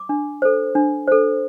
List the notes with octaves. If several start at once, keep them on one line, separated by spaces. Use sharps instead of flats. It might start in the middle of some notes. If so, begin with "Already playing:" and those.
Already playing: D6
D4
A4 C5
D4
A4 C5